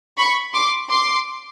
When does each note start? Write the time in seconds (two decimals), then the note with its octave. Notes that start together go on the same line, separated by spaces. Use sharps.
0.18 B5 C#6
0.53 C6 D6
0.90 C6 D6